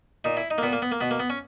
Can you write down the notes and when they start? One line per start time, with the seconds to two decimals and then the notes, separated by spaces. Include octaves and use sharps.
0.24 A#2 D#4
0.37 E4
0.51 D#4
0.58 A#3
0.63 A#2 B3
0.73 A#3
0.82 B3
0.92 A#3
1.01 B2 B3
1.11 A#3
1.20 B3
1.30 C#4